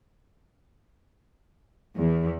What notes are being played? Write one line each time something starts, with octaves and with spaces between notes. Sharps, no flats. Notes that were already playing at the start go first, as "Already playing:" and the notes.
E2